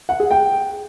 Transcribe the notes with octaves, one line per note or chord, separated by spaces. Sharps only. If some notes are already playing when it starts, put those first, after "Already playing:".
F#5
G#4
G5